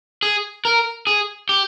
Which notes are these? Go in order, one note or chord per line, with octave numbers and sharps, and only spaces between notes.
G#4
A#4
G#4
G4